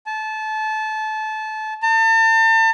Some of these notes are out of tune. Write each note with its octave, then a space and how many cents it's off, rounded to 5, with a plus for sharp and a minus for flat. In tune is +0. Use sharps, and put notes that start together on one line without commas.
A5 -25
A5 +40